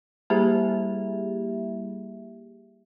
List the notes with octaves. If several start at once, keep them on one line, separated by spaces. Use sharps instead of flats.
G3 A#3 E4 G4 G#4 E5